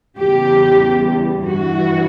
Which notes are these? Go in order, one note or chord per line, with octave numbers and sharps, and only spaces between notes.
E2 C#3 G3 G4
G2 E3 G3 F#4